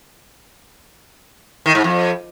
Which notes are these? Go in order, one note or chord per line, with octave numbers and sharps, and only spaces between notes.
D#3
G#2
F2